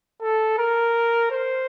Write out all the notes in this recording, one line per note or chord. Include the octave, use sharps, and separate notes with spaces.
A4
A#4
C5